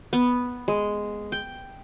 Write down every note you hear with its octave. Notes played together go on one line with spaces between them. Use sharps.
B3
G#3
G5